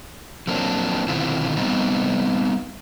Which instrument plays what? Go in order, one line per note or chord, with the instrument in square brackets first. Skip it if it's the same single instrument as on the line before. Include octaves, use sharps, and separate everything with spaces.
[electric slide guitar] F3 F#3 A#3 C4 D4
B2 D3 D#3 C4 E4 F4
G3 B3 C4 D#4